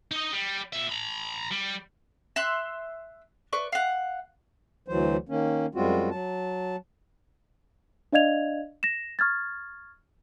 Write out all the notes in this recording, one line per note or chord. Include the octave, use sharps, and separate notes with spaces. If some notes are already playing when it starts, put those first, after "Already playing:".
D#4 D#5
G3
A#2 E5
A#5 B5
G3
E5 C6 F#6
B4 D5 C#6
F5 F#5
D2 E3 F#3 C5
D#3 A#3 C#4
F#2 G3 G#3 C4 F4 F#4
F#3 A5
D4 D5 D#5 F5 G#6 F7
A#6 E7
C#6 F6 G#6 A6